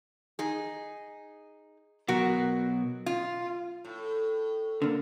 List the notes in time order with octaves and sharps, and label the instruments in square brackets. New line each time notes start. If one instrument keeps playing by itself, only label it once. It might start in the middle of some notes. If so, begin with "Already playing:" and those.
[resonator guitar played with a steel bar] D#4 G#4
[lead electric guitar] B2 F#3 [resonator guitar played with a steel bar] F#4 A#4
[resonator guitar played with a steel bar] F4
[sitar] A2
[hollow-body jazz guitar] D3 A#3